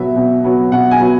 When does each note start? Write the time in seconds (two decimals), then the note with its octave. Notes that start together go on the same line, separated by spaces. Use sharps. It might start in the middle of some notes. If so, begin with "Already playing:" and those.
Already playing: B2 F#3 B3 E5
0.16 B2
0.44 F#3 B3
0.71 B2 F#5
0.91 G#5
1.00 F#3 B3